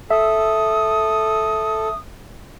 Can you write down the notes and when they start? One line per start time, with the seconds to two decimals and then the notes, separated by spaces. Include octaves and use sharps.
0.11 A4 E5 D#6